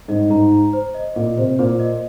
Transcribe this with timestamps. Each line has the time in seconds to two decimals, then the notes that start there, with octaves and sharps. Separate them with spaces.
0.08 G#2 D#5
0.30 G#2 A#5
0.52 A#5
0.73 C5
0.94 D#5
1.15 A#2 D#5
1.38 C3 C5
1.59 A#2 C5
1.80 D#5